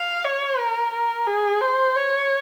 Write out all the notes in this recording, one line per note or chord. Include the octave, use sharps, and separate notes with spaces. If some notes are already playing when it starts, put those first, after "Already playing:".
Already playing: F5
C#5
A#4
A#4
G#4
C5
C#5